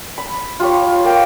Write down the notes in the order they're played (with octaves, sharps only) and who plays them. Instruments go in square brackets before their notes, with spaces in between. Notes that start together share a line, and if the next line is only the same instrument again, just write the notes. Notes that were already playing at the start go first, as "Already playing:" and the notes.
[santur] B5
F4 G4 C#5
A#3 G5